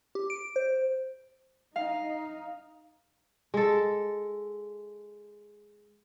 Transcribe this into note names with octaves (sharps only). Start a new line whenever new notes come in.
G4
D7
C5
D#4 F5
G#3 A4